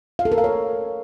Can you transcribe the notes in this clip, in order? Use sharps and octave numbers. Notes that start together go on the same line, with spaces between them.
F5
A4
A#4
F5
C#5